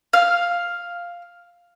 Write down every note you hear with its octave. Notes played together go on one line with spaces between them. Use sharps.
F5 F6